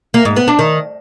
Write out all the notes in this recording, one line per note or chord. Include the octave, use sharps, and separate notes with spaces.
A#3
G#2
B3
D4
D#3